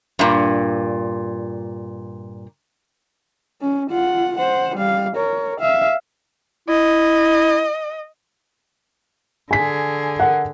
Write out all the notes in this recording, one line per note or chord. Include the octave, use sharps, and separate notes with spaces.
G2 A#2
C#4
F4 F#5
C5 F#5
G3 F5
A#4 C#5
E5 F5
E4 D#5
D3 G#4 G#5 B6
A#4 F#5